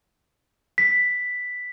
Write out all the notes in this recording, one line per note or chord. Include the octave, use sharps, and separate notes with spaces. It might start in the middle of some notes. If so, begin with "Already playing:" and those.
B6